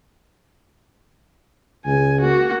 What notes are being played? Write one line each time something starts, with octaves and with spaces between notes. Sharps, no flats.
C#2 G#5
A#3 F#4